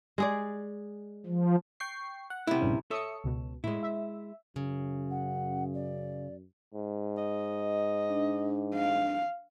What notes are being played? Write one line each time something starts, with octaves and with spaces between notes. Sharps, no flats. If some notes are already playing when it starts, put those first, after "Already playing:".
G#3 G#4 D5
F3
G5 C#6 C7
F#5
C3 E4
A#1 G2 C#3
A4 C#5 E5 D#6 C#7
C#2 B2
A2 G#3 E4
E5
F#2 C#3
F#5
D5
G#2
D#5
D4
F5